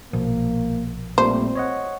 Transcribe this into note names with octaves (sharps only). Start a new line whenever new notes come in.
A#1 B2 F3 A#3
A#2 G3 A3 C4 C5
C#5 D#5 F#5